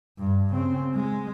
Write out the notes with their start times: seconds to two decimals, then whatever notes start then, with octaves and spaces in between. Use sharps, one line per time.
0.19 G2
0.52 C#3 C4
0.95 G#3